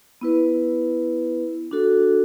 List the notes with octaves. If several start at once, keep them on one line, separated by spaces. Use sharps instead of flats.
B3 E4 B4
D4 F#4 A4